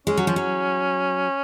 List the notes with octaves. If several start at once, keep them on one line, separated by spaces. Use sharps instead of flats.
G#3 C#4
F#3
F3
F#3